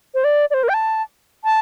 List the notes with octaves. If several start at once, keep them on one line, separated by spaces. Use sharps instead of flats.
C5
D5
D5
C5
A#4
G5
A5
A5